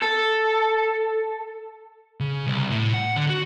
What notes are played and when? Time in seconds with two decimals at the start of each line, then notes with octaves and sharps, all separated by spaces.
0.02 A4
2.20 C#3
2.47 C2
2.70 A2
2.94 F#5
3.16 D3
3.30 F#4